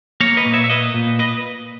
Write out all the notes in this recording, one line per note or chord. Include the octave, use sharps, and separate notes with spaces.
A#3 A#4 C#5
B4 D#5
A#2
C#5 E5
E5
A#3 B4 D#5
A#2
B4 D#5